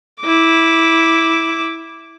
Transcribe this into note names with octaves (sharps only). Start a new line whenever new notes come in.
E4 D6